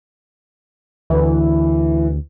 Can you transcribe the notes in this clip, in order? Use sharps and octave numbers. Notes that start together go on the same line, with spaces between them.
D2 E3